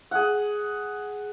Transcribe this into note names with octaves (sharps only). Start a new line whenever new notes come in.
G#4 F#5